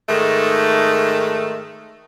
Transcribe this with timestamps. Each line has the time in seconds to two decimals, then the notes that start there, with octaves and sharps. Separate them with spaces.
0.09 G#2 D#3 A3